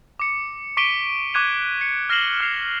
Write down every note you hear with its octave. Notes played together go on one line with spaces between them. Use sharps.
D6 C#7
C#6 D6 B6 D7 D#7 G7
C#6 D6 F#6 G#6 D#7 F7
C#7
F6 A#6 C7 E7 F#7 G7
F6 C7 F7